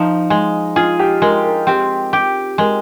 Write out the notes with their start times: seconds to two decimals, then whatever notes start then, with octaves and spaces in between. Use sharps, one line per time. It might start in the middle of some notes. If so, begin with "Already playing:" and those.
Already playing: F3 D#4
0.30 G#3
0.76 F4 G#4
0.99 G4
1.22 G#3 A#4
1.44 A#4
1.67 C4 G4
2.13 G4
2.58 G#3 A#4